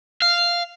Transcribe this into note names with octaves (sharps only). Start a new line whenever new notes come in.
F5